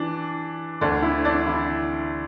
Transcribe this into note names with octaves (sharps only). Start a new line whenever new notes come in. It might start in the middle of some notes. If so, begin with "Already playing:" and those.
Already playing: E3 D4
D2 D3 D4
E4
D4
E4